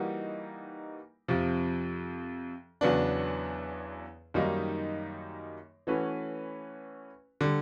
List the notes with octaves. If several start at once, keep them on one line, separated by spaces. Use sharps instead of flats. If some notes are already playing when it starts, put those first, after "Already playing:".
Already playing: E3 G3 A#3 D#4 F#4
F2 C3 F3
E2 C#3 F#3 B3 D4
F#2 D#3 G3 A#3 D#4
E3 A3 C#4 F#4 B4
D3 G3